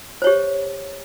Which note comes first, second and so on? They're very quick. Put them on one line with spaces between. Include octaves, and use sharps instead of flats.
C5 C#5 G4